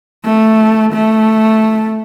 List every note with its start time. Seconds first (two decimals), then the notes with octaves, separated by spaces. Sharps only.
0.25 A3
0.93 A3